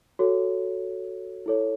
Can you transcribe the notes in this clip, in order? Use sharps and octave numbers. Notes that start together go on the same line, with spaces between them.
F#4 A4 C#5
E4 A4 C#5